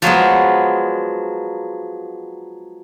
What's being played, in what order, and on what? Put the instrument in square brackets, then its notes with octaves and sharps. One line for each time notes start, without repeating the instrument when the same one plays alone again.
[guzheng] F3 F#3 G#3 B3